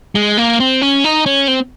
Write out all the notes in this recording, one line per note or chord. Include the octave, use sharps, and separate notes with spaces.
G#3
A#3
C4
C#4
D#4
C#4
C4